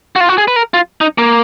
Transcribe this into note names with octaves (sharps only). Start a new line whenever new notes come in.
F#4
F4
F#4
G#4
B4
A#4
F4
D#4
A#3